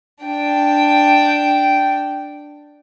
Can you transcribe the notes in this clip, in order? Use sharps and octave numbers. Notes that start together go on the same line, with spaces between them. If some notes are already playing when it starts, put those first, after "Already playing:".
D4 G5